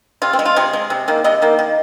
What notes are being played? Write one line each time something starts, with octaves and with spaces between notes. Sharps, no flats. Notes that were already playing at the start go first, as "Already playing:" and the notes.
C3 F4
C4
G#3
F4
C3 G#4
G#3
C3
D#3 A#3
C3 D#5
D#3 A#3
D#3